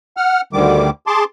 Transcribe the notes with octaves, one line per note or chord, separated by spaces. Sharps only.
F#5 F6
D2 D3 D#3 G3 D6
G#4 A5 C6 D6